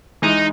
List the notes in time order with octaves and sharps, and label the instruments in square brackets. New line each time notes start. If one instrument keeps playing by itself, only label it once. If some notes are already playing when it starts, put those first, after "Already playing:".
[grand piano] E3 G#3 [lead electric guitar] D#4